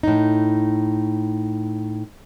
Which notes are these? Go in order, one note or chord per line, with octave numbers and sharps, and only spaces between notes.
A2 D#4